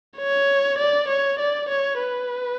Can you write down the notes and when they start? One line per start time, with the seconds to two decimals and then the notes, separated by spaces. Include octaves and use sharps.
0.17 C#5
0.78 D5
1.08 C#5
1.39 D5
1.69 C#5
2.00 B4